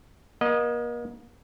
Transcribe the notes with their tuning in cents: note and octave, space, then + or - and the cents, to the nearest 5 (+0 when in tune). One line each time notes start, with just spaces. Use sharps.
A#3 +40 D#5 -10